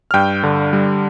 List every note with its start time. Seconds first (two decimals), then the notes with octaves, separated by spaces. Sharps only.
0.11 F6
0.14 G2 G5 G6
0.43 D3
0.73 G3